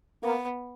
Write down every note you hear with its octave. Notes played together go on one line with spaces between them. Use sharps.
A#3 B3